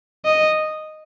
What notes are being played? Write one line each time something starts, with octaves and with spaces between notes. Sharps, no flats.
D#5